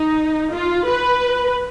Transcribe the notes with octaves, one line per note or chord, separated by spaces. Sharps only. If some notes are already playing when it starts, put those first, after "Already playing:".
Already playing: D#4
F4
B4